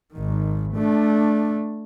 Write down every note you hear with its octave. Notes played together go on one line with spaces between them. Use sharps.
G#1 D#3
A3 D4